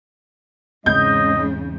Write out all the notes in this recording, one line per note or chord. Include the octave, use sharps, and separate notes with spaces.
E2 G#2 C#3 C4 D#5 G6